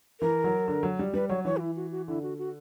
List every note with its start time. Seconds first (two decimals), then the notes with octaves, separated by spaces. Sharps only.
0.20 E3 A#4
0.44 F#3
0.68 D3
0.83 F#3
0.99 G3
1.14 G3 B4
1.29 F#3 C#5
1.45 E3 C#5
1.57 F#4
1.60 E4
1.76 F#4
1.91 F#4
2.08 D3 E4
2.23 F#4
2.38 F#4